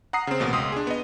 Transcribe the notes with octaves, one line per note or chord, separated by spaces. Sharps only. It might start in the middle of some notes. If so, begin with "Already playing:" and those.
F#5 A#5 D#6 C7
C#3 C4
A1 B2 A#3 D#6
C#2 C6 D#6
D4 G#4
B3 D#5